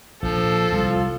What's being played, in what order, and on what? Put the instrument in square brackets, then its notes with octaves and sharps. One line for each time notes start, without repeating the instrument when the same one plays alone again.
[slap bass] A#1 A#2 [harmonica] F3 [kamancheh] A4
[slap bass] C2 [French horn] F4